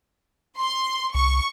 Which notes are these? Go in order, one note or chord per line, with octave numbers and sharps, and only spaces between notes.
C6
C2 C#6